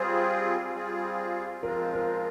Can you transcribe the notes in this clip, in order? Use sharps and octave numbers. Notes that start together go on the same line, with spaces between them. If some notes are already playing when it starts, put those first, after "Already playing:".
Already playing: G3 C4 F4 G#4 C5
G3 C4 F4 G#4
F3 G#3 C4 F4 A#4
A#4